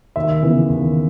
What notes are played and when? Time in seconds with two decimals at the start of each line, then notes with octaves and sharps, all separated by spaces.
0.16 D#2 E5
0.42 C#3 E3 B3
0.69 D#2